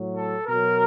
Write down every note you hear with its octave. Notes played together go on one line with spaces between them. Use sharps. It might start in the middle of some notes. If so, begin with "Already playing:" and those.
Already playing: A2 F#3
A4
B2 F#3 A#4